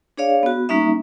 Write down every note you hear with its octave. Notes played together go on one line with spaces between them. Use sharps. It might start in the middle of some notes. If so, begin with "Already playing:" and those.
D4 G#4 C#5 D5 F5
B3 F#4
G3 A#3 C#4 D#4 E5